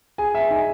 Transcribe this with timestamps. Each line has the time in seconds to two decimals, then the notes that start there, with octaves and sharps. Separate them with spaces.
0.18 G#4 G#5
0.35 E5
0.51 D#4 G#5